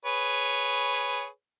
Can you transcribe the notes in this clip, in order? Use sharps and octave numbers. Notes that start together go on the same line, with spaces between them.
G#4 B4 C#5